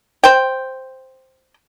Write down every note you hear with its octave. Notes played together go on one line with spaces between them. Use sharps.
C5 G5